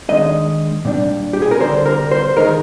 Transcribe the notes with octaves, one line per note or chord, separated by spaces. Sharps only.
D#3 G#3 D4 D#5
A#2 G3 D4
G4
G#4
A#4
D3 G3 D4 C5
A#4
C5
D#3 G#3 D#4 A#4